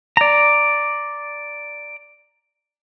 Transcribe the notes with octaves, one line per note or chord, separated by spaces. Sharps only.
D5 A#5